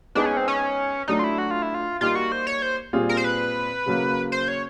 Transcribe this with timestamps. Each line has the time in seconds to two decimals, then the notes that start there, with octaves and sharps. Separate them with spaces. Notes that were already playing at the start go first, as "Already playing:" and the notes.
0.15 G#3 B3 D4 D#4 G#4 B4
0.26 C#4
0.37 C4
0.48 C#4
1.08 F#3 A3 D4 D#4
1.19 F4
1.24 E4
1.38 F#4
1.51 F4
1.62 E4
1.74 F4
2.01 G3 A#3 D#4 F4 G4
2.15 F#4
2.32 C5
2.47 C#5
2.62 C5
2.93 A#2 G3 C4 F4 G#4
3.09 A#4
3.17 C5
3.24 B4
3.86 C#3 F#3 A#3
4.32 C5
4.48 C#5